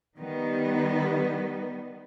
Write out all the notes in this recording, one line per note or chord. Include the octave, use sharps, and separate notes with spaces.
D#3 G3 B3